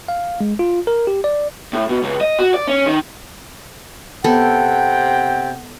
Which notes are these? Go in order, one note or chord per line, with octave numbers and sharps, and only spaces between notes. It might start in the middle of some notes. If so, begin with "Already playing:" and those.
F5
G#3
F4
A#4
G4
D5
A2
B2
C#2
D#5
F#4
D5
C#4
D#3
C3 B3 A4 F#5 G5